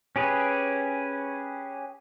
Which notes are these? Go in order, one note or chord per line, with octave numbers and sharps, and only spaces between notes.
C#4 G4 G#4 B4